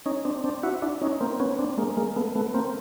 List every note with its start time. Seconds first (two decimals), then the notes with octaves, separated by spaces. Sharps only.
0.06 C#4 D#4
0.25 C4 D4
0.44 C4 D4
0.63 E4 F#4
0.82 D4 E4
1.02 C#4 D#4
1.21 A#3 C4
1.40 B3 C#4
1.59 C4 D4
1.77 G#3 A#3
1.97 G#3 A#3
2.16 A3 B3
2.35 A3 B3
2.54 A#3 C4